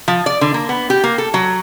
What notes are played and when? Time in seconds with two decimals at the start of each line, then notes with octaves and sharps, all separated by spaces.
0.08 F3
0.26 D5
0.41 D3
0.54 A#3
0.69 B3
0.90 G4
1.04 A#3
1.18 A4
1.34 F#3